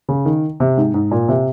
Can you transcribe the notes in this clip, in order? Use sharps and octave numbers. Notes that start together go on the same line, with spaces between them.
C#3
D#3
C3
G#2
G#2
A#2
C3